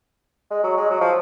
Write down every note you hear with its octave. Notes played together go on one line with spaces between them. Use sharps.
G#3
F#3
G#3
F#3
F3